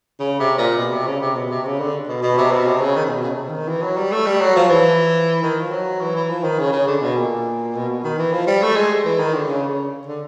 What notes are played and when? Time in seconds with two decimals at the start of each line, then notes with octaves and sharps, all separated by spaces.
0.20 C#3
0.40 C3
0.58 A#2
0.77 B2
0.92 C3
1.07 C#3
1.21 C3
1.36 B2
1.50 C3
1.65 C#3
1.80 D3
2.08 B2
2.23 B2
2.38 C3
2.52 B2
2.67 C3
2.81 C#3
2.96 D#3
3.05 C3
3.10 B2
3.23 C#3
3.30 C3
3.49 D#3
3.68 E3
3.82 F#3
3.97 G3
4.12 A3
4.26 G3
4.41 F#3
4.56 F3
4.70 E3
5.42 D#3
5.61 F3
5.71 F#3
6.01 E3
6.15 E3
6.30 F3
6.44 D#3
6.59 C#3
6.73 C#3
6.87 D3
7.02 B2
7.17 A#2
7.75 B2
7.89 B2
8.04 D#3
8.19 E3
8.32 F3
8.47 G3
8.62 A3
8.76 G#3
9.05 E3
9.19 D#3
9.34 D3
9.49 C#3
9.68 C#3
10.07 D3